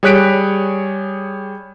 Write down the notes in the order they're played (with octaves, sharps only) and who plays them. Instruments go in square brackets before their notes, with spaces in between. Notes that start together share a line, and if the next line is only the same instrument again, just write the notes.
[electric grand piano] G3 G#4 C#5 F#6 B6 D7